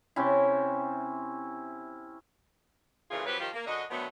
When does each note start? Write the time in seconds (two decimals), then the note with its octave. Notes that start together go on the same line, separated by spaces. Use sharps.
0.16 C3 C#4 E4
3.11 D2 A#2 C#3 E3 F4 G#4
3.26 F3 F#3 C4 G4 B4
3.40 D#3 F3 F4 G4
3.53 A#3
3.66 F#2 D3 F#4 D#5
3.90 D3 D#3 F#3 A3 B3